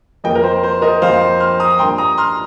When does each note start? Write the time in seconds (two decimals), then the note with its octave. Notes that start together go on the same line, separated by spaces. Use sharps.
0.24 F2 F3 A#3 D#5 G5
0.35 A#4
0.44 C5
0.63 C5
0.82 A#4 D#5
1.02 F2 F3 A#3 C5 F5
1.40 C6 F6
1.60 A#5 D#6
1.79 G2 F3 A#3 G5 C6
1.98 A#5 D#6
2.17 C6 F6